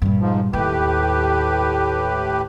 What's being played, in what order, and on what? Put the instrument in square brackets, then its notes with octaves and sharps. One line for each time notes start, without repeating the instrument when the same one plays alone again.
[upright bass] G2 A#2
[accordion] G#2 F3
[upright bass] D#2 [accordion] A2 G4 B4